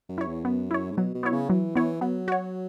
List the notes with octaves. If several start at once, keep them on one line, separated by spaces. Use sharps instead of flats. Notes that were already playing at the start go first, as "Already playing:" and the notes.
F#2
E4 C#5
E2
F#2 B3
E4 C#5
G#2
B2 F#3
B2
B3 E4 C#5
C#3
E3 F#3
E3 B3 E4 C#5
F#3 B3
F#4 C#5